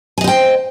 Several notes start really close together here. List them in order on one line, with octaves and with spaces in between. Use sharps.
G#5 D#5 C5 G5